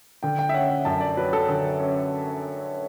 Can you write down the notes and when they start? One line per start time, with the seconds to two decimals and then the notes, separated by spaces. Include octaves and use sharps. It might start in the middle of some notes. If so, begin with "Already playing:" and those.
0.23 D3 G5
0.39 G5
0.49 E5
0.54 C#4 F#5
0.70 E5
0.85 F#2 A5
1.00 D5
1.17 F#3 B4
1.33 A4
1.48 D3 A4
1.80 C#4